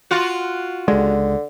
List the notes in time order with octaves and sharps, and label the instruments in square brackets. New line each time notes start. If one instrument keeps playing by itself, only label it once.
[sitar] F4 F#4
[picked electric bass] C#2 G#3 [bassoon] D3